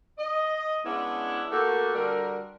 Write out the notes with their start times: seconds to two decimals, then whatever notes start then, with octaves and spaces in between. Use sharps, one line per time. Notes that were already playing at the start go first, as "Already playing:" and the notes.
0.18 D#5
0.84 G#3 B3 C#4 D4 E4
1.51 A3 A#3 F#4 G4 A4 A#4
1.94 D3 G3 F#4 A#4